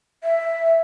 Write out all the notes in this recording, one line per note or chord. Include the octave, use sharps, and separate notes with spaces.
E5